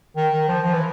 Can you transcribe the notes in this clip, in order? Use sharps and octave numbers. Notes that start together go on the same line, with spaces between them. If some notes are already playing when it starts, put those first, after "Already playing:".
D#3
D#3
F3
F3
E3